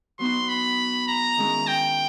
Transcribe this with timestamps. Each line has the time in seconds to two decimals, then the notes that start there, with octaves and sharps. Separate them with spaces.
0.19 F#3 B3 D#4 C6
0.49 B5
1.08 A#5
1.37 D#3 G#3 C#4 E4
1.67 G5